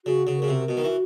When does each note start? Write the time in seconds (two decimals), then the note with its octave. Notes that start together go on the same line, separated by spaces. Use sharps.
0.06 C#3 F#4
0.27 C#3
0.37 C#3 A#4
0.48 C3
0.68 B2 F#4
0.77 D#3
0.84 E3